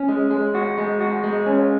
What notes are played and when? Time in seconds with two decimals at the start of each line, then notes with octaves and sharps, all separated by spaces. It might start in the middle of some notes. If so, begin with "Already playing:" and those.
Already playing: C#4
0.09 G#3
0.30 G#3
0.55 F#4
0.78 G#3
1.01 F#4
1.24 G#3
1.46 C#4